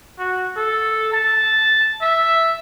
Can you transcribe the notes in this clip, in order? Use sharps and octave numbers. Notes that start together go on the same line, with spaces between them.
F#4
A4
A5
E5